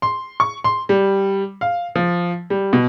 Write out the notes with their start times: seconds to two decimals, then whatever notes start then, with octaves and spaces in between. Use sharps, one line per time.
0.02 C6
0.40 C#6
0.64 C6
0.89 G3
1.61 F5
1.95 F3
2.50 G3
2.73 B2